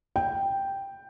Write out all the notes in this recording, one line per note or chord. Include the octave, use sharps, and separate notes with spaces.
G5